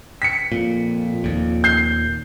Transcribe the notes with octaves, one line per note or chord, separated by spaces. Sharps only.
B6 C#7
F2 A#2
D#2 A#2
G6 C7